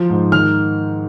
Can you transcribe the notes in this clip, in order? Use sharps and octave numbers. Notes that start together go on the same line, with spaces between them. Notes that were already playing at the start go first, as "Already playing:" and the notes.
Already playing: F3 F4
G#2
D#3 F6